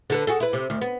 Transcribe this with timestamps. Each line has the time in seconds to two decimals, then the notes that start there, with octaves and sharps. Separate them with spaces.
0.10 D3 A4 B4
0.27 F#4 G#4 A4
0.40 E4 B4
0.53 C3
0.70 D2 D#3
0.81 B3